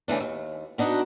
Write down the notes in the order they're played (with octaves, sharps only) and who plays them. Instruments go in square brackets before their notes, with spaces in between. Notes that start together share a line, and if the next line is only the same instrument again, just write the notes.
[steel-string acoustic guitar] C#3 E3 A3 D4
D#2
B3 D4 D#4 F4 F#4